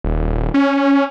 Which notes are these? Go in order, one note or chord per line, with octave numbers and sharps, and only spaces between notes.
D#1
C#4